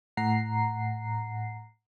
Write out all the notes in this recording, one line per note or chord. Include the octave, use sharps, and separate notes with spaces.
A2 F#5 A#5 C7